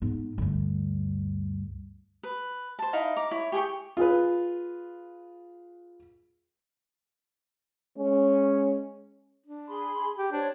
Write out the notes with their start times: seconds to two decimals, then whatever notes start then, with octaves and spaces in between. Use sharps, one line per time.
0.02 G#2 B3
0.38 D2 G2
2.23 B4
2.79 C5 A5
2.93 D#4 E4 F5
3.16 A#5 D6
3.31 E4 C#5
3.52 G4 G#4 G5 C#6
3.97 F4 G#4 B4
7.98 G#3 C#4
9.46 D4
9.68 G#4 B5 C6
10.18 G4
10.32 D4 C5 C#5